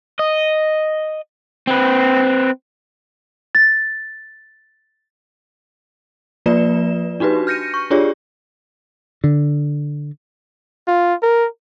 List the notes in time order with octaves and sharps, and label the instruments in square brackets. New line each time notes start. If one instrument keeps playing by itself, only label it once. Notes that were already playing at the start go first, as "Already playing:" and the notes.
[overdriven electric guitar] D#5
C4 B4
[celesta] A6
[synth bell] F3 A#3 F4 B4 D5 E7
D4 D#4 F#4 G4 B4
F6 G6 A#6 C#7 D#7
C#6
D4 F4 G4 G#4 C#5 D5
[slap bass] D3
[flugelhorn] F4
A#4